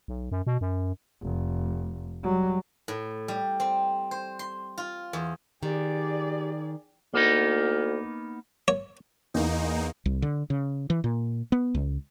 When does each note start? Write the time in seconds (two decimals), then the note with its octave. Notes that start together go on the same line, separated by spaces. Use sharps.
0.08 B1
0.31 F#2
0.47 B2
0.61 F#2
1.23 F1
2.23 F#3 G3
2.88 A2
3.28 G3
3.60 C4
4.11 C5
4.39 C6
4.78 F4
5.13 E2
5.63 D#3 G4 G#4 D5
7.14 D2 A#3 B3 D#4
8.68 C#5
9.34 E2 A#3 D#4
10.06 C2
10.22 D3
10.50 C#3
10.90 E3
11.04 A#2
11.52 B3
11.75 C#2